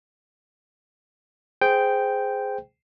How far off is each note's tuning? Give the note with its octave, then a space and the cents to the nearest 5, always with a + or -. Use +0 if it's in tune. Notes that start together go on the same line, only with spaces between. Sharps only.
G#4 +0 C5 -15 G5 +0